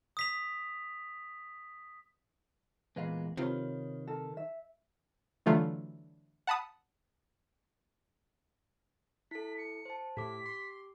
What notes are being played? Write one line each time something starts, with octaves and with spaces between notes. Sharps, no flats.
D#6 B6 F7
E2 A#2 G#3 B4 F5
C3 D#3 F4 B4 C#5
A4 A#4
E5
D3 E3 F#3 A3 F4
F#5 A5 B5 D#6
E4 A4 B6
C#7
C5 A5
A2 G4 D6 B6
C6